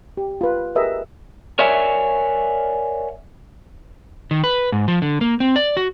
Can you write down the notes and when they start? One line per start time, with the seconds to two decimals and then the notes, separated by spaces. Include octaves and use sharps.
0.17 G4
0.41 F4 B4
0.75 G4 G#4 A#4 B4 D#5 E5
1.59 A#4 C#5 D5 E5 F#5 G#5
4.31 D#3
4.44 B4
4.72 G#2
4.88 F3
5.02 D3
5.21 A#3
5.40 C4
5.56 D5
5.77 F#4